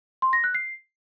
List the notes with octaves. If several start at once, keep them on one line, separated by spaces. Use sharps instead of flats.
C6
A#6
F#6
C7